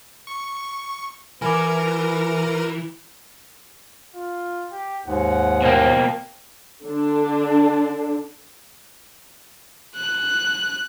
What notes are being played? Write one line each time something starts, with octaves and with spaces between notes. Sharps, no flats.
C#6
E3 F#4 A#4 B4 G#5 B5 D6
F4
G4
D#2 G#2 F#5
B2 A#3 C5 G5
D3 D4
F#6